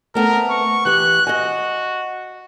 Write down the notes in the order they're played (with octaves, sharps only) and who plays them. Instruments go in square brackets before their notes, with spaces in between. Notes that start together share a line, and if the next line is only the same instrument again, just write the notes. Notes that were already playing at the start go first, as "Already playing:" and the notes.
[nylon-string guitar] A3 B3 C4 [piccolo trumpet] A#4
[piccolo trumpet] C#6
[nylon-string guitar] E3 G4 [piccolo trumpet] F#6
[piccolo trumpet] F#4 [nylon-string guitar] D#5 G#5